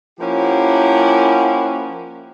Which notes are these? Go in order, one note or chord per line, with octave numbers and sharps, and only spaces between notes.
F3 A#3 C#4 E4 G4 F#5